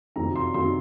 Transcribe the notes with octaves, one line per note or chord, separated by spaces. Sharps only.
F2 C3 D#3 F#3 A#5
C6
C3 D#3 F#3 C6